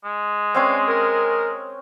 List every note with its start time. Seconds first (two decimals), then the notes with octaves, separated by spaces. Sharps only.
0.04 G#3
0.55 C4 C#4 B4 C#5 D5 F5
0.88 A#4